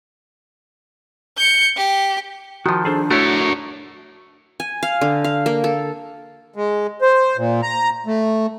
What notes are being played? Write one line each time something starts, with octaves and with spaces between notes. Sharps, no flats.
G6 C#7
G4
D#3 F3 F#4
D4 G#4 A4 C5
A3 E4 F#4 A#4 C#5
G#5
F5
D3
F5
A#3
A4
G#3
C5
A#2
A#5
A3